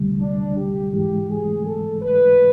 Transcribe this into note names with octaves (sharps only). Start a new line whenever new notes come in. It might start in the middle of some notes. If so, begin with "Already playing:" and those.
Already playing: D2 D3 G3
D4
G4
G#2 E3 G#3 G4
G#4
A4
B4